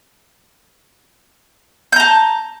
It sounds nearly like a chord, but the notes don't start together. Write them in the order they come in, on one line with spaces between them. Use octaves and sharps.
G6 A#5 A5